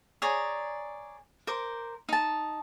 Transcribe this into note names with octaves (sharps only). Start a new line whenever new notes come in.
G#4 C#5 D5 A#5
A#4 C5 D6
D#4 A5